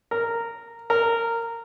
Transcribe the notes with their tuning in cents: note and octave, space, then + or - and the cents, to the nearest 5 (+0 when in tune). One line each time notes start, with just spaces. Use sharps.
A#4 -10
A#4 -15